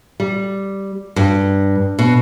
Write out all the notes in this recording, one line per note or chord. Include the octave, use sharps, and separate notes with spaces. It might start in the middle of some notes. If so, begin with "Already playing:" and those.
G3
G2
B2